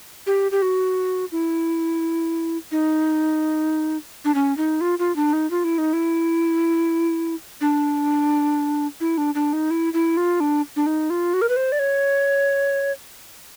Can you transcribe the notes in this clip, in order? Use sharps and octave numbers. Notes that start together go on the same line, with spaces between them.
G4
G4
F#4
E4
D#4
D4
C#4
D#4
F4
F4
D4
D#4
F4
E4
D#4
E4
D4
E4
D4
D4
D#4
E4
E4
F4
D4
D4
D#4
F4
F#4
A#4
B4
C5
D5
C#5